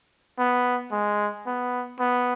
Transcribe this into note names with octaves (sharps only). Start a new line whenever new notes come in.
B3
G#3
B3
B3